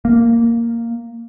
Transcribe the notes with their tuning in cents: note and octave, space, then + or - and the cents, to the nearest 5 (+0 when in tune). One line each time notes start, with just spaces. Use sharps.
A#3 -5